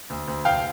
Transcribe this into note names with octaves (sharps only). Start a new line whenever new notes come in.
D2
D2
F1 F5 G5